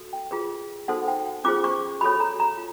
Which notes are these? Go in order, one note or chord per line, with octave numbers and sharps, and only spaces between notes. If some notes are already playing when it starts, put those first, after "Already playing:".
Already playing: F#4 A4
G5
F4 G#4 B4
D#4 F#4 A4 C5 F#5
G5
C#4 F4 G#4 C5 D6
C#6
F#4 A4 C#5 B5
A#5
A#5
F4